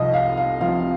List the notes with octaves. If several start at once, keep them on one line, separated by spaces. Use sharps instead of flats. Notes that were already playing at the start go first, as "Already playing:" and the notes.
Already playing: C2 C3 F3 D#5
F5
F5
C2 C3 F3 F5